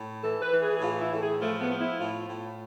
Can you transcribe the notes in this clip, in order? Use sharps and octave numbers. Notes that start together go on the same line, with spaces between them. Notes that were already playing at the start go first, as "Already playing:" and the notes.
Already playing: A2
E3 A4
B4
E3
G#4
G#4
A2 F4
E4
A2 A4
G#4
F3 A3
B3
F3
E4
A2 F4
A2